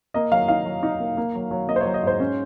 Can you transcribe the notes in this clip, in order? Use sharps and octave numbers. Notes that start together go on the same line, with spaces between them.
A#3 D#5
F#3 F5
D#4 F5
F#3
D#4
A#3
A#3
F#3
F#3
A#3 D#5
C5
F#3 C#5
D#5
G#2 C5
C#4